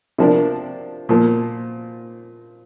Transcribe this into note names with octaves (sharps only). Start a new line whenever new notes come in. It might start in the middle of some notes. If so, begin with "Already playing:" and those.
C3 F3 D4 A#4
A#2 F3 A#3